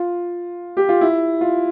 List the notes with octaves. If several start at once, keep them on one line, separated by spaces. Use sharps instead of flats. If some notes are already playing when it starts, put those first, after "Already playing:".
Already playing: F4
G4
F4
E4
F4